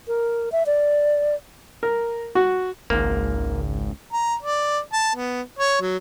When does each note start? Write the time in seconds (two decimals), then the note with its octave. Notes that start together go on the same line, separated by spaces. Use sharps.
0.08 A#4
0.52 E5
0.66 D5
1.83 A#4
2.35 F#4
2.90 G#1 C#2 G#2 A#3
4.13 A#5
4.43 D5
4.93 A5
5.15 B3
5.59 C#5
5.82 F#3